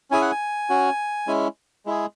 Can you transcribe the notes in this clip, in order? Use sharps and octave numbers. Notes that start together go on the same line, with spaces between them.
C#4 E4 G#4 G#5
F#5
G#5
C#4 F#4
G#3 C#4 E4
G#3 E4 G#4